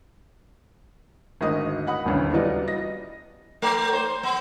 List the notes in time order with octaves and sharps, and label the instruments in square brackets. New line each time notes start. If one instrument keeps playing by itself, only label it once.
[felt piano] G#1 D2 F#4 D#5 D#6
D#5 F#5 B5 D#6
D#1 A1 D2 C#3
F#3 G3 B3 F4 D5 D#5
D#5 A#6
[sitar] A3
C5
B3